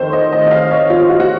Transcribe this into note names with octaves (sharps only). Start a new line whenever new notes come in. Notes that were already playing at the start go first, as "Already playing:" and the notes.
Already playing: F2 D#3 A3 C5 C#5
D#5
D#5
D#5
F5
C#5
F4
F4
F#4
F#4